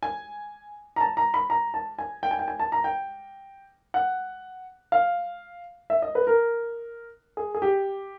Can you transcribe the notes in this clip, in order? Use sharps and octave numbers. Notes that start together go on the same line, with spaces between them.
G#5
A#5
A5
A#5
B5
A#5
A5
G#5
G5
G#5
G5
G#5
A5
A#5
G5
F#5
F5
E5
D#5
B4
A#4
G#4
G#4
G4